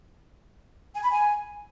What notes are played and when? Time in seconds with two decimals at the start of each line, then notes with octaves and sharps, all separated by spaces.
0.95 G#5
1.03 B5
1.11 G#5